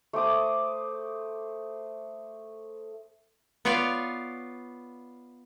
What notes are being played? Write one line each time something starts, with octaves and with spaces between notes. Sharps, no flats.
A3 C5 D6 D#6
B3 F4 C#5 D5 F5